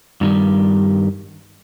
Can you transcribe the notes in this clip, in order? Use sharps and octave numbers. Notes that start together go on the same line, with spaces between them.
G2 D#3 G3